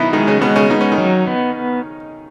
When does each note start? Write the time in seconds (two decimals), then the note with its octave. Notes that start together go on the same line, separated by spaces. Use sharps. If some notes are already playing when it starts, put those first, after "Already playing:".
Already playing: B2 D#3 F#3 B3 D#4 E4
0.13 D#3 G#3 D#4
0.27 C#3 C#4
0.41 B2 G#3 B3
0.56 C#3 C#4
0.70 B3 D#4
0.81 C#4
0.92 D#3 D#4
0.98 F#3
1.27 B3